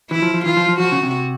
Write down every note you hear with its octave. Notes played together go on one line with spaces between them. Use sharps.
E3 E4
F3
F3
E3 F4
F3
F3
F3 F#4
C#3
C3